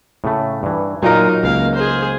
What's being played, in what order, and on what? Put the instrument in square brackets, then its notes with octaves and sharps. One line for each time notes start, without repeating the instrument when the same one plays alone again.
[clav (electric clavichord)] A2 C#3 A3
G2 E3
[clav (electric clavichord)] A#2 [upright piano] F#3 F4 A#4 [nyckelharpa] D#4
[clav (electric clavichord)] C#2 [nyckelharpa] A#3 F5
[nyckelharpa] G#4 C5